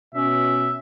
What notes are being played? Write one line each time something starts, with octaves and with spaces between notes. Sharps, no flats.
B2 C#4 E5